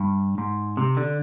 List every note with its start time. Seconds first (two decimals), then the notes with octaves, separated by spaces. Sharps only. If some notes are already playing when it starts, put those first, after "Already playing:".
Already playing: G2
0.38 G#2
0.77 C3
0.97 D3